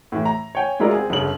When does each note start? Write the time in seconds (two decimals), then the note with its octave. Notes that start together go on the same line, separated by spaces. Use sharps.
0.12 A2 E3
0.25 A#5
0.55 C#5 G5 G#5
0.79 F#3 G#3 E4 F4 A#4 D5
0.92 C4 G#4
1.10 G1 F#2 C#3 F#7